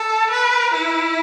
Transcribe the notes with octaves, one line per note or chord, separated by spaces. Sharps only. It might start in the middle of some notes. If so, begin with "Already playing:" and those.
Already playing: A4
B4
E4